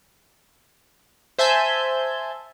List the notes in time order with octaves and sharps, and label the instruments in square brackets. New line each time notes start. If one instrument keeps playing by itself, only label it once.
[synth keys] C5 E5 G#5 A5 G6